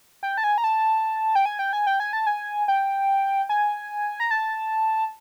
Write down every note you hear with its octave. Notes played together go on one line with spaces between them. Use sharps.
G5
A5
G#5
A#5
A5
G5
G#5
G5
G#5
G5
G#5
A5
G#5
G5
G#5
A#5
A5